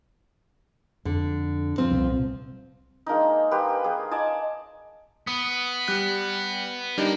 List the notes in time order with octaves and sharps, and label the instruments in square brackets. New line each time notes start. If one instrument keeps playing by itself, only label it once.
[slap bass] F2 [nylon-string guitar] D3
[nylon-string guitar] F3 C4
[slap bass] C2 A#2
[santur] G#3 A#3 D4 D#4
A#3 G4 B4 C5
A#3 G#4
D5 D#5 G#5 A5
[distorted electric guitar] B3 [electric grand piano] D#6
[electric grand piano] G3 F#6 C#7
[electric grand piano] G3 D4 D#4 [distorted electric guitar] A#3 A#4